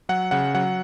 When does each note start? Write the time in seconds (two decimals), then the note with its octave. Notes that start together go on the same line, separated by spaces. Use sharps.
0.09 F#3 F#5
0.31 C#3 F#5
0.55 F#3 F#5